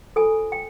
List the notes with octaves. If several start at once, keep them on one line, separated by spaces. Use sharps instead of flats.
F4 A4 C5 G#5
G5